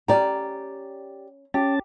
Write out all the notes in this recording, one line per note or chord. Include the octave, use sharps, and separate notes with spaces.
C#4 D#4 G4 D5 A#5
C#4 G4 A5